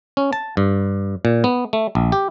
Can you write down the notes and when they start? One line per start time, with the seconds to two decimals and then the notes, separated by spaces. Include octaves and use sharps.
0.17 C#4
0.33 A5
0.57 G2
1.25 A#2
1.44 B3
1.73 A3
1.95 A#1
2.12 G4